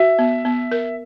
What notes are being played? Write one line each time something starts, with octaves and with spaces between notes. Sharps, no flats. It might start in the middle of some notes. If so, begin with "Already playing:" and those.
Already playing: F#4 E5
B3
B3
A#4